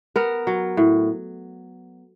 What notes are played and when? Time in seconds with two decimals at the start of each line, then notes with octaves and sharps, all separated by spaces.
0.16 B3 A#4
0.47 F#3
0.77 A2